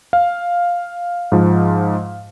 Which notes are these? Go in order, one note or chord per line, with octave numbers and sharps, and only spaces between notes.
F5
G#2 F3